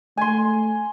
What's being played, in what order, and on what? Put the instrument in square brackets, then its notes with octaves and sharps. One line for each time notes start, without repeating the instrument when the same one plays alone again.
[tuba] A3 [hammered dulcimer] G#5 C6